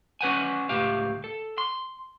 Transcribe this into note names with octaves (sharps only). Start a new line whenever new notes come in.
C#4 B4 F#5 G#5
C#2 A2 G4 F5
A4
C6